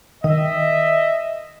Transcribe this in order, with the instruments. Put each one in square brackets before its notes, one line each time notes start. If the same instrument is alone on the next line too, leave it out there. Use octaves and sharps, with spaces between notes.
[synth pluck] D#3 [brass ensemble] D#5 E5